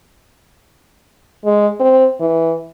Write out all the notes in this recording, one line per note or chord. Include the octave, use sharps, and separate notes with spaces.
G#3
C4
E3